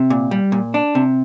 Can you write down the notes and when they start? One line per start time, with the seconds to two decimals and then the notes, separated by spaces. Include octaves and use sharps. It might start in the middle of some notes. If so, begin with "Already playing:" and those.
Already playing: C3
0.10 A#2
0.31 G3
0.52 A#2
0.74 D4
0.95 C3